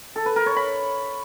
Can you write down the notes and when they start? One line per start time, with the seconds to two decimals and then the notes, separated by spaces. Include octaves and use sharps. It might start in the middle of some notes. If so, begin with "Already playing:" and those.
0.16 A4
0.26 B4
0.36 A#4
0.46 C#5
0.56 B5